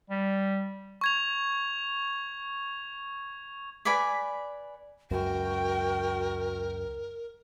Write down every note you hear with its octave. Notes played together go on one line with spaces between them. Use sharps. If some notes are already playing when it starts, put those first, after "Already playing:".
G3
C#6 G#6 F7
B4 D5 G#5 B5
C#2 F#2 F#4 A#4 G5